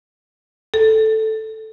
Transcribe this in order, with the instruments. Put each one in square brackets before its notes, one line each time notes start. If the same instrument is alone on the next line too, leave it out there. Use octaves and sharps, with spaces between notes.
[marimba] A4